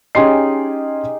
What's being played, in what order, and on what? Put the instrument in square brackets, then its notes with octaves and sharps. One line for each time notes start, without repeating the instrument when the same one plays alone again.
[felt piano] C#4 C6 C7 [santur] D#4 G4 G#4